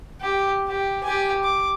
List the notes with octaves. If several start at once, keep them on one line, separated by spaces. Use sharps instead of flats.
G4
G4
G4 G#5
D6